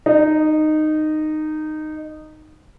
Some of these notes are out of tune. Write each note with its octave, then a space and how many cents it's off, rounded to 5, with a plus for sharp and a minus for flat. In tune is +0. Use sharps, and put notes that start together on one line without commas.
D#4 -15